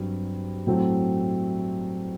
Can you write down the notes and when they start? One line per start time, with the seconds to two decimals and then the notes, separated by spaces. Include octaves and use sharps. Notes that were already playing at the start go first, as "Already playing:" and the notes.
Already playing: G2 F#3 C4
0.66 A2 F#3 A3 C4